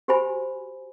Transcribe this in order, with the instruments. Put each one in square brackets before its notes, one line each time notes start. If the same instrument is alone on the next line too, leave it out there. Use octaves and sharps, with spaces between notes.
[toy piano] F#4 G4 C5 G#5 B5